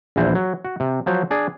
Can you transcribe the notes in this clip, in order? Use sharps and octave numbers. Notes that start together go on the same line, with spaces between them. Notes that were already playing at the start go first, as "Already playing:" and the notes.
A#1 E2 E3 C5
F#3
F#4
C3
F3 F#3 C5
D4 G#4 D5